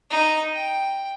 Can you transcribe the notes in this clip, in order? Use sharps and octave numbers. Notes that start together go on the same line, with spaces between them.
D#4
G5